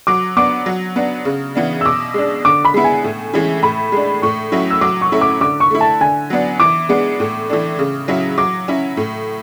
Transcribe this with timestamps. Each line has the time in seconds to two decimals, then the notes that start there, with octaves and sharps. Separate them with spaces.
0.07 F#3 D6
0.37 B3 D4 D6
0.66 F#3
0.96 B3 D4
1.25 C#3
1.55 E3 B3 D4
1.81 E6
1.85 B2 D6
2.14 G#3 D4
2.45 D3 D6
2.65 B5
2.74 G#3 B3 E4
2.84 G#5
3.04 A2
3.34 E3 G#3 C#4 E4
3.63 A2 B5
3.92 G#3 D4
4.22 A2 C#6
4.52 F#3 C#4 E4
4.70 E6
4.81 F#3 D6
5.01 C#6
5.12 A3 C#4 E4
5.21 D6
5.41 D3 D6
5.60 C#6
5.71 A3 E4
5.81 A5
6.01 D3 G#5
6.30 F#3 B3 D4
6.60 E3 D6
6.89 G#3 B3 D4
7.20 A2
7.49 E3 A3 D4
7.79 C#3
8.08 F#3 C#4 E4
8.38 F#3 D6
8.68 C#4 E4
8.97 A2